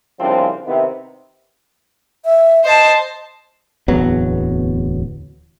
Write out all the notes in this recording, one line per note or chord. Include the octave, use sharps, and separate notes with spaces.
C2 C#3 F3 C4 D4 F4
C3 D#3 B3 C4 E4
E5
C5 D#5 A5
D1 E2 F#3 B3